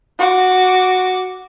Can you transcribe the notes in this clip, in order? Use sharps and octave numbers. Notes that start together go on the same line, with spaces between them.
F#4 D6